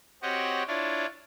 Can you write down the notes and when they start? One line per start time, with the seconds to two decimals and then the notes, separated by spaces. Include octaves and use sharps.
0.22 C4 F#4 G4 C#5 D#5 F#5
0.68 D4 E4 F4 C#5 D5